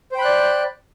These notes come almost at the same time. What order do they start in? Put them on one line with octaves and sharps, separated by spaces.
C5 G5 B5 F#6 D5